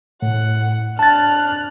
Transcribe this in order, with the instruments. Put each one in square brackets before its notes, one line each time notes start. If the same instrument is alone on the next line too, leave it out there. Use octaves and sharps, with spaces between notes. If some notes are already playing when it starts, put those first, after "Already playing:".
[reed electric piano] A2 [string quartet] F#5
[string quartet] D4 F6 F#6 [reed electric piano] A5 A6